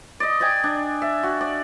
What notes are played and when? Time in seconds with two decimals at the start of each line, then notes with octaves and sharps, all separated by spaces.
0.20 D5 D#5
0.40 D5 D#5 G5 G#5
0.64 D4
1.02 E5
1.23 F#4
1.41 D5